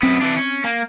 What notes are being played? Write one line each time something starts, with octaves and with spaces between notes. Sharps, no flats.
F#2 B3 C4
E3 D4
C#4
A#3